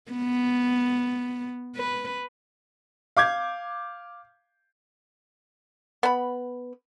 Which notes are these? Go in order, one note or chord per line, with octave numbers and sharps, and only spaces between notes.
B3
B4
F5 D6 G6 G#6
B3 B5